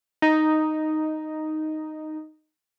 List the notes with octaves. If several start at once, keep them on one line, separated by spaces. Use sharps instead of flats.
D#4